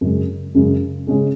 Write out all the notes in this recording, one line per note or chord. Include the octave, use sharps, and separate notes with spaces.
F#2 C#3 G#3
F#2 C#3 G#3
C#3 G#3 C#4 G#4